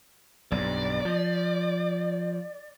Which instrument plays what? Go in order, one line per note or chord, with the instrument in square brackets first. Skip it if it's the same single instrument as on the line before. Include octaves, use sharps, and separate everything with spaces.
[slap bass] B1 G2 [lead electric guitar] D5
[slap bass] F3